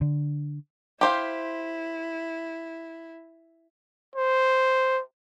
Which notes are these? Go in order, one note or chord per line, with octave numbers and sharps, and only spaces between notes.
D3
E4 G4 C5 F5
C5